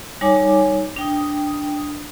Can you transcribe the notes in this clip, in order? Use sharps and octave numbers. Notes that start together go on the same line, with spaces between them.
G3 D#4 C#5 G#5 D6
D4 G5 D#6